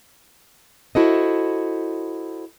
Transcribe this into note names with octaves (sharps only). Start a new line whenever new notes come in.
E4 F#4 A4 C5 D#5